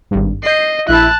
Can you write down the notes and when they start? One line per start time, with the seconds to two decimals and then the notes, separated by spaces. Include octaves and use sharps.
0.11 G#1 G2
0.43 D#5 G6 C7
0.89 A#1 E4 A5 F#6